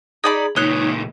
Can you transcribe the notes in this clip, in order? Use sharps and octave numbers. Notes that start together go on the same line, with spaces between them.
D#4 G#4 D5 B5
C#2 A#2 D#4 C#5 F#6